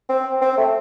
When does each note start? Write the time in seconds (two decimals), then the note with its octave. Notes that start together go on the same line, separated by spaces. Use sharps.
0.09 C4
0.41 C4
0.57 A3